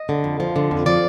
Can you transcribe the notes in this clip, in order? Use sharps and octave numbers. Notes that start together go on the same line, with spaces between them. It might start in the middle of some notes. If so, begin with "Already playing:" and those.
Already playing: D#5
D3
F2
F3
D3
F2
F3 D5